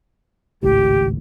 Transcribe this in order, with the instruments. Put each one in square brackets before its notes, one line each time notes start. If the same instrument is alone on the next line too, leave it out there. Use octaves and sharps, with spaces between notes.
[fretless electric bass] G#1 C#2 A2 [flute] G4